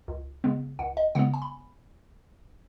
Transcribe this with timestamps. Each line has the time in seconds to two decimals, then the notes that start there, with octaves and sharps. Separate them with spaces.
0.08 C#2
0.44 C#3 G#3 B3
0.79 C#2 F#5
0.97 D#5
1.15 C#3 G#3 B3 F#5
1.34 G#5
1.42 B5